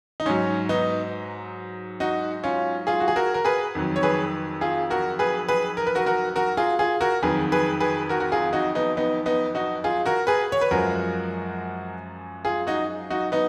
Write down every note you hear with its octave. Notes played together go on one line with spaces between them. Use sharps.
D#4
G#2 F#3 C#4
B3 D#4
D#4 F#4
C#4 F4
F4 G#4
F#4
G#4
F#4 A#4
A#4
G#4 B4
F2 D#3 F#3
C#5
G#4 B4
F4 G#4
F#4 A#4
G#4 B4
G#4 B4
A#4
B4
F#4 A#4
F#4 A#4
F#4 A#4
F4 G#4
F4 G#4
F#4 A#4
F2 D#3 F#3 G#4 B4
G#4 B4
G#4 B4
F#4 A#4
F#4
F4 G#4
D#4 F#4
B3 D#4
B3 D#4
B3 D#4
D#4 F#4
F4 G#4
F#4 A#4
G#4 B4
C#5
B4
F#2 F3 G#3 F#4 A#4
F4 G#4
D#4 F#4
D#4 F#4
B3 D#4